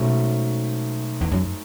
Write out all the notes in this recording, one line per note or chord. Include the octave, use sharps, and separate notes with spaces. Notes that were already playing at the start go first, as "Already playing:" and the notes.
Already playing: G#2 B2 F#3 A3 C#4
E2
F#2